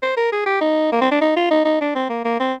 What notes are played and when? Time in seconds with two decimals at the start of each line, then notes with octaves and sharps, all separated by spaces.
0.02 C5
0.17 A#4
0.32 G#4
0.46 G4
0.61 D#4
0.92 A#3
1.01 C4
1.11 D4
1.21 D#4
1.36 F4
1.51 D#4
1.65 D#4
1.81 D4
1.95 C4
2.09 A#3
2.24 A#3
2.40 C4